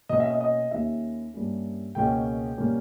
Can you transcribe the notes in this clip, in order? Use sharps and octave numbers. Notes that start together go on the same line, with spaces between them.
B2 A#3 C#4 D#5
E5
D#5
D#5
D#2 D#3 A#3 C#4 E5
G2 G3 A#3 C#4
C#2 B2 A#3 C#4 G5
B2 G3 A#3 C#4